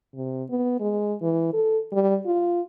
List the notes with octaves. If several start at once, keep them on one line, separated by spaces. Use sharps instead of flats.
C3
B3
G#3
E3
A4
G3
F4